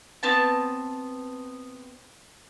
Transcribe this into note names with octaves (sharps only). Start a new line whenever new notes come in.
B3 C4 A5